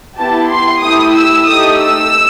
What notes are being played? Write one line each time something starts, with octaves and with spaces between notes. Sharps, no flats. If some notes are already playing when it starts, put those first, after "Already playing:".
B3 E4 G4 A5
C6
A3 E4 G4 D#6
E6
A3 D#4 G4 D#6
E6